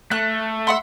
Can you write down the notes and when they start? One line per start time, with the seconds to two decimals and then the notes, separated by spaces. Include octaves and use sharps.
0.11 A3 F#6
0.67 E5 F#5 C6